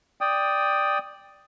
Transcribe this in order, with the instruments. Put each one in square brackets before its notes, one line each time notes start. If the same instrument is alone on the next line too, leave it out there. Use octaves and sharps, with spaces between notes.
[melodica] D5 G5 D#6